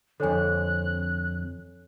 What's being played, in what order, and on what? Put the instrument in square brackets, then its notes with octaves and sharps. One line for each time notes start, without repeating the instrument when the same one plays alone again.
[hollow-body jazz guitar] F2 D3 [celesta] A4 C#5 G#5 [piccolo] F#6